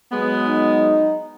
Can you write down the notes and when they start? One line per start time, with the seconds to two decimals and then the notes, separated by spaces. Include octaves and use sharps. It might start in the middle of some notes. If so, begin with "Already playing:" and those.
0.12 F#3 G#3 B3
0.47 D#4